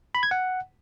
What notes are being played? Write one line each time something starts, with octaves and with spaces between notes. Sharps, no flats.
B5
G#6
F#5